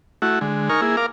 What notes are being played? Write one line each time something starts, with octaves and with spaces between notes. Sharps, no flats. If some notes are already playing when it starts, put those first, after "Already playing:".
A3 E4 F#4
D3 G#3
D#4 A#4 G#5 C#6 F6
A#3 E4 G#4
A#4 F5 D6